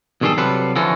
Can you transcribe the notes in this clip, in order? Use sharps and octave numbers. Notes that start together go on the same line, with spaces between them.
B1 G2 D#3 G3 G#4 A4
C3 F#3 G3 F4 A4 B4
D3 E3 F3 C#4 F#4 A4